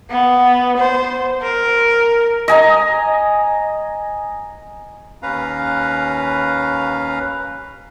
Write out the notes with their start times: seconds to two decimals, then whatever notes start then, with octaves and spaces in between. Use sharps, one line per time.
0.10 B3
0.78 C5
1.42 A#4
2.48 D#5 G#5 A#5
5.23 D#2 C#4 B4 F5 A#5